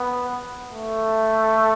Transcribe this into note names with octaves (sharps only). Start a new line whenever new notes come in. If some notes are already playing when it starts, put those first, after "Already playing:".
Already playing: B3
A3